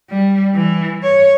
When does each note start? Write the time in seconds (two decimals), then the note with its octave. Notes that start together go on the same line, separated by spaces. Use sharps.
0.10 G3
0.55 E3
1.03 C#5